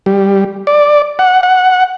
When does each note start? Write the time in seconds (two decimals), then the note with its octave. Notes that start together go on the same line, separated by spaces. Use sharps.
0.06 G3
0.67 D5
1.19 F#5
1.43 F#5